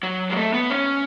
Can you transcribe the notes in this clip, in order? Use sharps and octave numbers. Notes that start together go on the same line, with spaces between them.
F#3
G#3
A3
B3
C#4